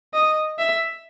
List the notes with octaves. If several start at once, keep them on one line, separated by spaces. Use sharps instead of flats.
D#5
E5